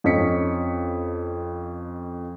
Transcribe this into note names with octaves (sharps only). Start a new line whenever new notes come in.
F2 C#4 D#5 B6 C#7